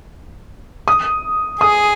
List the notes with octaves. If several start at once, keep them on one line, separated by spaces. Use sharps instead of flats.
D#6
G#4 D#6